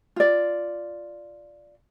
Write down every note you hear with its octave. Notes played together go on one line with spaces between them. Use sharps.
F4 D5